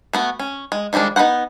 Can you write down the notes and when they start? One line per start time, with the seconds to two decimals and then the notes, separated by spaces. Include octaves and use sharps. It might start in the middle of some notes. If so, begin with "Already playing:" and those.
0.13 A3 B3 F#4
0.39 C#4
0.72 G#3
0.93 D#3 F3 G3 G#3 D4
1.16 B3 D#4 B4 C5 F#5